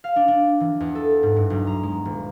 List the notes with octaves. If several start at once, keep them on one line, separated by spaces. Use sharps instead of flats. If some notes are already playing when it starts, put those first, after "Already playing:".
F5
D4
D4
E3
E2
A4
G#2
G2
B1
A#5
G#3
D#1